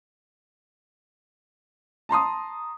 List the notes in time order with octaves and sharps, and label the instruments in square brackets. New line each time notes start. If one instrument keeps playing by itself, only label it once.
[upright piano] A5 A#5 C6 D#6